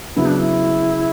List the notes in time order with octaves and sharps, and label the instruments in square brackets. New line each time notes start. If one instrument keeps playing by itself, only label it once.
[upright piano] C#3 F#3 B3 [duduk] E4
[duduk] D4
E4